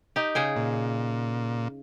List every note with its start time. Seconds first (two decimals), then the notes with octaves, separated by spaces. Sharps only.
0.16 D#4 G4
0.35 C#3 G#4 G5
0.56 A#2